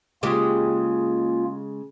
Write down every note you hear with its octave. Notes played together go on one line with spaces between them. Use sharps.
C#3 G#3 A#3 F4 G4